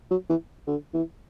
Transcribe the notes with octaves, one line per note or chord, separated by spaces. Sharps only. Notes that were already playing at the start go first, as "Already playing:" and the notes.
F#3
E3
D3
E3